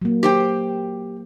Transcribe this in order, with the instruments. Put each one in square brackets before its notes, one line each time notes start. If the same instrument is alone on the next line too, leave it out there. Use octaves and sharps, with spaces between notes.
[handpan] F#3 A#3
[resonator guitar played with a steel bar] G4 C5 G5